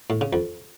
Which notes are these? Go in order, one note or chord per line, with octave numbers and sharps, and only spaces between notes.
A2
C#3
F2